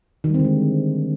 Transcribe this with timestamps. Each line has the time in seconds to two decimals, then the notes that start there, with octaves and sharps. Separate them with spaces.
0.24 D#3
0.29 G3
0.34 C4
0.39 D3
0.44 G#3